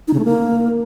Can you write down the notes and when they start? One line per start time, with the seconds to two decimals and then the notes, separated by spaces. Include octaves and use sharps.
0.08 D#4
0.13 C#3
0.19 A3
0.25 A#3